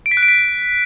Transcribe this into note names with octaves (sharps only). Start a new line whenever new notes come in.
D7
B6
F#6
D7
B6